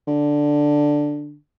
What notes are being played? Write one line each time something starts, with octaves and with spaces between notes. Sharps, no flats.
D3